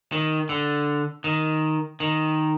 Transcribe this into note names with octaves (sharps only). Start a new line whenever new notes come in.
D#3
D3
D#3
D#3